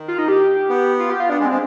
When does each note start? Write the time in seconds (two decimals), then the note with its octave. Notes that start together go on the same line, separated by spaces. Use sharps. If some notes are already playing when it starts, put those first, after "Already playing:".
Already playing: D#3
0.08 F4
0.18 D#4
0.28 G4
0.69 B3
0.99 F4
1.10 G4
1.20 F4
1.30 B3 D4
1.40 G#3
1.45 C4
1.51 G#3